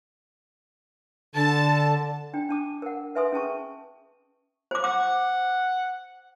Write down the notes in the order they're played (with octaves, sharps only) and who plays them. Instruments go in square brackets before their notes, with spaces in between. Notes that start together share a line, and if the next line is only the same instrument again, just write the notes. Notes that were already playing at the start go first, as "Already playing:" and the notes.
[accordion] D3 [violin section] A5
[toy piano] D4 G5
D4 A5 D6
A#4 F#5
B4 E5 G#5 C6 D#6
C#4 G#4 A5 C#6
C5 D6
[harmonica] F#5 [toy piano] D6